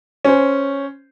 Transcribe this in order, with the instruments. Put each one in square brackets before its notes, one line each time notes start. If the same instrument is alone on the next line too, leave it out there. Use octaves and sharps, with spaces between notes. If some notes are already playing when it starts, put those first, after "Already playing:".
[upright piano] C#4 C5